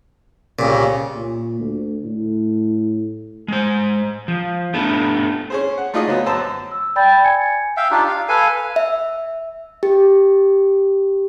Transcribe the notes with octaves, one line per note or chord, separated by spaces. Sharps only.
C2 A#2 C#3
A#2
D2
A2
G#3 C5
F3
A3 B3 D4 A4
C#4 G#4 C5
F#5
A3 D#4 F4 G#4 D5 D#5
D2 F#3 B3
F#2 C5 A5 E6
E6
D5 G5 B5 G6 A6
G#5 G#6 C#7
E5 F5 G5
D4 D#4 F4 G4
F5
A4 B4 F5 G#5
E5
G4